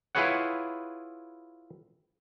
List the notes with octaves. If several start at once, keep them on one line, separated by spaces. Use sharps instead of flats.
E4 F4 G#4 B4 C#5 F#5